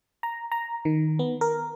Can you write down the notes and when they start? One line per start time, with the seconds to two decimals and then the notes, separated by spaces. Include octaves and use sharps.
0.23 A#5
0.52 A#5
0.85 D#3
1.19 B3
1.41 A#4